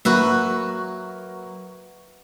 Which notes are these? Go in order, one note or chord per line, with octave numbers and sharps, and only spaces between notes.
F#3 A#3 F#4 B4 E5